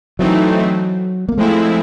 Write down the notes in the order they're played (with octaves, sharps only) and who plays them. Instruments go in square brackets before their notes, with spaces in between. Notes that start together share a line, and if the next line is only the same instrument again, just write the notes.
[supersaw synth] E3 A3 C4 D#4 [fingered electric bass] F#3
[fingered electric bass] A#3
[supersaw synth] F3 G#3 C4 E4 [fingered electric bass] A3